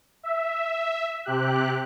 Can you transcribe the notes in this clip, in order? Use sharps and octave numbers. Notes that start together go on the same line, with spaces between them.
E5
C3 G4 F#6